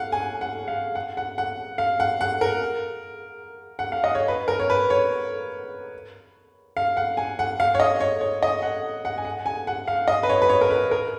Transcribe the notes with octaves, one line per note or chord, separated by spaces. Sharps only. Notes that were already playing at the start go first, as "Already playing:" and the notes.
Already playing: F5 F#5
G#5
F#5
F5
F#5
F#5
F#5
F5
F#5
F#5
A#4
F#5
F5
D#5
C#5
B4
A#4
C#5
B4
C#5
F5
F#5
G#5
F#5
F5
C#5
D#5
C#5
C#5
D#5
F#5
F#5
G#5
F#5
G#5
F#5
F5
D#5
B4
C#5
B4
C#5
A#4
B4
A#4